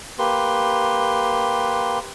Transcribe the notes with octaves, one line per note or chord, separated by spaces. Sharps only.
A#3 G4 B4 C6